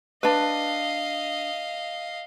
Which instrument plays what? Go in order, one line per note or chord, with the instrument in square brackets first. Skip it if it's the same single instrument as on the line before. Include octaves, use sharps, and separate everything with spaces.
[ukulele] D4 B4 [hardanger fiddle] D#5 F5